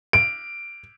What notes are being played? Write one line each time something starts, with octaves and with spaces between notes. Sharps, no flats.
D7